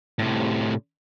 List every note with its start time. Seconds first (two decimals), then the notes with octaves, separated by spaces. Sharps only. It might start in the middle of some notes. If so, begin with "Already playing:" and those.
0.19 A2 C3